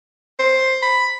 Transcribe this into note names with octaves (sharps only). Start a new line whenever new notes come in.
C5
B5